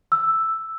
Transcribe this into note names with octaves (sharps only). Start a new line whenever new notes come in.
E6